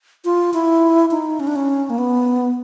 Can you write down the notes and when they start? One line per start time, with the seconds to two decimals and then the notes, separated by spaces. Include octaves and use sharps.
0.25 F4
0.54 E4
1.11 D#4
1.40 C#4
1.47 D4
1.56 C#4
1.90 A#3
1.98 B3